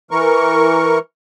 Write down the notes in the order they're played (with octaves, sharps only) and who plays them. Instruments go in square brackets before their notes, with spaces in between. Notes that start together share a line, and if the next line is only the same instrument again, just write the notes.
[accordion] E3 A#4 C#6